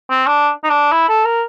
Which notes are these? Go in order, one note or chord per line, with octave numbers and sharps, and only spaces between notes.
C4
D4
D#4
D4
E4
A4
A#4